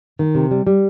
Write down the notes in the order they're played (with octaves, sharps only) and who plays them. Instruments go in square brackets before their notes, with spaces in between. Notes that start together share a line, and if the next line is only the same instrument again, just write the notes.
[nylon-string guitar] D#3
C3
G3
G3